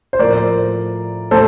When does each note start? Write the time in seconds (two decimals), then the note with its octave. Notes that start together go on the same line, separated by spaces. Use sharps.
0.13 C5
0.19 A2 F3 A3 A#4 D5
1.31 A2 A4 C5